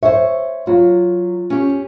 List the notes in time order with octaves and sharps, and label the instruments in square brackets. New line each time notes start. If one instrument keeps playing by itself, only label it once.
[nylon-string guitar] C5 C#5 [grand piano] E5
[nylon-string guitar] F#3 [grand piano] F4
[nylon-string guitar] C#4 G4